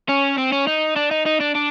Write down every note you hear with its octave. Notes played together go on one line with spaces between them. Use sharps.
C#4
C4
C#4
D#4
D4
D#4
D#4
D4
D4